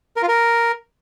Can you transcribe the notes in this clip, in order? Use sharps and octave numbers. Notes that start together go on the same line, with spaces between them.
A#4
F4
A#4